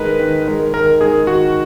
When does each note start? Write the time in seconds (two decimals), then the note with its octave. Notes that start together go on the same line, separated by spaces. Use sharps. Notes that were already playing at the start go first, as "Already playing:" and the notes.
Already playing: D#3 G#3 D#4 A#4 B4
0.19 D#3
0.47 G#3 D#4 A#4
0.74 D#3 A#4
1.00 G#3 D#4 G#4 A#4
1.27 D#3 F#4